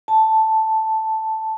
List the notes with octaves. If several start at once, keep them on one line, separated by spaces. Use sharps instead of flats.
A5